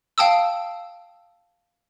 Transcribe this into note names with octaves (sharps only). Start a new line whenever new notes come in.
F5 G5 A5 D#6 E6